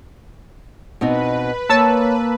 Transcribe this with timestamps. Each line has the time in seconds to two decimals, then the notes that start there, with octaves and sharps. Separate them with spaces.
1.01 B2 C4 D#4 B4
1.69 A#3 C#5 A5 E6